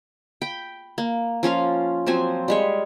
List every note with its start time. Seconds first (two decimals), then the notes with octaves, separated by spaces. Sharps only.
0.42 G5 B5
0.98 A#3
1.43 F3 C#4 F4 F5
2.06 F3 F#3 C4 G#5
2.48 G3 G#3 C#5